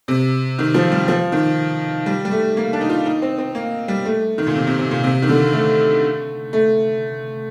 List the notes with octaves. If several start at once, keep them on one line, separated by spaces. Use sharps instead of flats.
C3
D#3
F3
G3
F3
D#3
G3
G3
A3
A#3
D4
D#4
F4
D#4
C4
C4
A#3
G3
A3
D#3
A#2
C3
C3
C3
A#2
C3
D#3
D3
A3
A3